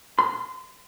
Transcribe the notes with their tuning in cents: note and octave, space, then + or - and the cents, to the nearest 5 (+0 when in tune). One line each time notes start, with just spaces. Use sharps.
C6 -30